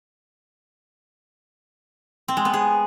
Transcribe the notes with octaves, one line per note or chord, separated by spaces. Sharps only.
C4
G#3
B3
G#4